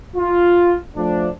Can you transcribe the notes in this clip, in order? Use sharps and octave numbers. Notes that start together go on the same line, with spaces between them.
F4
F3 A3 D4